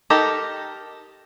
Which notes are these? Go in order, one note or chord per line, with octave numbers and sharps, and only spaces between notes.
D#4 G4 A4 A#4